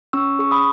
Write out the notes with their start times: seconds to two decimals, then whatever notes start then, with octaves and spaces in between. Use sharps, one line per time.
0.13 C#4 C#6 E6
0.39 G#4 C#6
0.51 B5 D#6